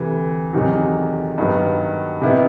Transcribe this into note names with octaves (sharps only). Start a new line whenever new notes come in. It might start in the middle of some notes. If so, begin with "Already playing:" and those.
Already playing: D2 C3 E3
E2 C3 D#3 F#3
G2 D#3 F#3 B3
C3 D#3 G3 B3 E4